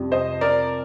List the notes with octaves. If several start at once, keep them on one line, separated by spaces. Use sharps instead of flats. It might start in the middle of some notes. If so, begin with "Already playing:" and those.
Already playing: F2 C3 G3
C5 D#5
A#4 D5